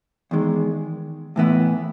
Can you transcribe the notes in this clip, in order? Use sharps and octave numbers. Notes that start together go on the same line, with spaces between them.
E2 D#3 G#3
A2 E3 B3 E4